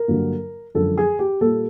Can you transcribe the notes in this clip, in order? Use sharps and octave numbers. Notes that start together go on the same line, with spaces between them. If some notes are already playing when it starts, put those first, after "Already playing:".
Already playing: A#4
G2 D3 F#3 A#3
F#2 D3 F3 G#3 A4
G#4
G4
A#2 G3 A#3 A4